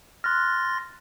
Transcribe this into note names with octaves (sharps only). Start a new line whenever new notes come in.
C6 F6 F#6 A6 A#6